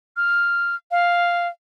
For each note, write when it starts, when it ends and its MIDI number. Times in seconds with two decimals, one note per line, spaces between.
0.17 0.75 89
0.91 1.48 77